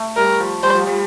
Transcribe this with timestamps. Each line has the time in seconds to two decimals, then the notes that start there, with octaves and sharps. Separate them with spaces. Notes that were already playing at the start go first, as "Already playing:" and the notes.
Already playing: A3
0.16 G3 A#4
0.40 F3
0.63 G3 C5
0.75 F3
0.87 G3